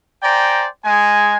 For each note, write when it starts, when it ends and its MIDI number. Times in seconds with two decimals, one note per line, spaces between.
0.23 0.66 72
0.23 0.66 74
0.23 0.66 79
0.23 0.66 80
0.23 0.66 82
0.85 1.37 56
0.85 1.37 80